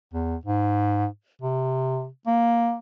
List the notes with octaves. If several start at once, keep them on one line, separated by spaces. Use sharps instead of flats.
E2
G#2
C3
A#3